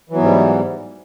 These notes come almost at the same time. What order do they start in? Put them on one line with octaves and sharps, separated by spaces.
E3 F#3 B3 G#2 G3